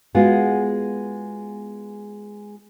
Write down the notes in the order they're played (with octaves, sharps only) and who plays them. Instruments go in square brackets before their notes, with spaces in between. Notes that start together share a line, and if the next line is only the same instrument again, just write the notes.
[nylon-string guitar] G#3 B3 F4 F#4 G#4